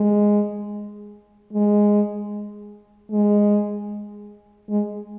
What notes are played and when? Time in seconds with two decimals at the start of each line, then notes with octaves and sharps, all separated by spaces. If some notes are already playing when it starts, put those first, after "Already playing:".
Already playing: G#3
1.53 G#3
3.11 G#3
4.69 G#3